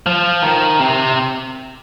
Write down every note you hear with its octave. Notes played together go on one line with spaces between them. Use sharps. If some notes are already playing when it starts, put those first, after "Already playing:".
F3
D#3
C3